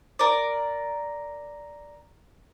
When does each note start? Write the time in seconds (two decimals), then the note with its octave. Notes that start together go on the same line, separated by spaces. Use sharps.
0.19 A#4 D5